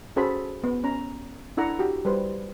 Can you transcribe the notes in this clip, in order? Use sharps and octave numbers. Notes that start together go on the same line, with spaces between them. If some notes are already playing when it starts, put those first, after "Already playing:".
C#4 F#4 G#4 A4 C5 B5
B3
C#4 A#5
D4 E4 A4 F#5 A#5
F#4 G4
G3 B4 C5